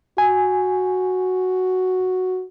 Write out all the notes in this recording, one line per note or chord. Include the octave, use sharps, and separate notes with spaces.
F#4 G#5